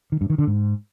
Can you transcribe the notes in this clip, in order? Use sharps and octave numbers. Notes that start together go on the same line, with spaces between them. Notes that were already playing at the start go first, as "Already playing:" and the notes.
D#3
G2
D#3
D3
G#2